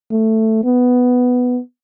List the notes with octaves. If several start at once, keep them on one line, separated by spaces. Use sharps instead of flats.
A3
B3